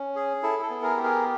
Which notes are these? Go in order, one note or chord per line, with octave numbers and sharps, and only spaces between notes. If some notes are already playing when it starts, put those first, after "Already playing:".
Already playing: C#4
G#4
E4 A4
A4
B3
G#4 A#4
G4
G#4 A#4